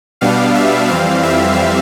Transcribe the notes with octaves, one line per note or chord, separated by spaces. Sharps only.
B2 G3 B3 D4 F5
E5
F2 E3 G3 C4 F5
E5